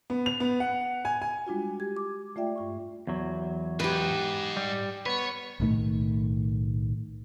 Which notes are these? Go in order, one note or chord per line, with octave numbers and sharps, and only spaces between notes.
B3
F7
B3
F#5
G#5
G#5
G3 G#3 D4 F4 F#4
G4 G#6
D6
A3 F4 D5 E5 G5
G2 F4 C#6
E2 F#3
G#2 G4 B4
G3
B3 B4 C#5
B1 A2 D#3 A3